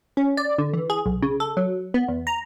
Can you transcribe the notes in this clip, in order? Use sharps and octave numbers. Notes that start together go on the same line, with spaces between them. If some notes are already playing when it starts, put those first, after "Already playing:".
C#4
D5
D3
E3
G#4
B1
C#3
A4
F#3
B3
E2
A#5